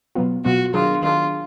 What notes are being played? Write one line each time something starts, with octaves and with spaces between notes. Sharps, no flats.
B2 F#3 B3 F4
B2 F#3 B3 F4 F#4
D#3 F#3 D4 F4 G#4
D#3 F#3 D4 F4 G#4